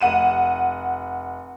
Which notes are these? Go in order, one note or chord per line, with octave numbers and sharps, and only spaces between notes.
F1 F#5 D#7 E7